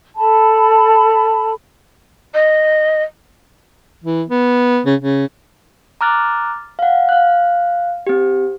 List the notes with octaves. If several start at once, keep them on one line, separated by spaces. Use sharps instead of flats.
A4 A5 B5
D#5
E3
B3
C#3
C#3
A#5 D6 F6 F#6 A6
F5 F#5
F5 F#6
C4 G4